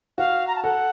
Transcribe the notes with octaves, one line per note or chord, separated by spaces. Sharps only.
F#4 F5
A#5
A5
A4 F#5